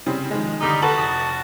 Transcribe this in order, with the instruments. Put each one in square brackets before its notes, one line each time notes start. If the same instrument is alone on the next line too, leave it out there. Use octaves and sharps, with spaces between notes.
[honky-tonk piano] C#3 G3 C4
D#3 F3 G#3
[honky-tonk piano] D3 D#6 [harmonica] G3 D#4
[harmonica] F#4 A5 [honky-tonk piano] A4 B4 F#7
[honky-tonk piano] F1 D#6